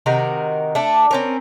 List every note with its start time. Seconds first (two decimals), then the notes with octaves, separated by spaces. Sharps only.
0.06 C3 D#3 F#4 A#4
0.75 A3 D4
1.11 C4 C#4 A#4